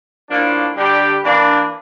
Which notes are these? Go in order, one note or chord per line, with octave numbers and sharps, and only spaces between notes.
A2 F3 A#3 D4
D3 G3 D4 G4
E3 A#3 D4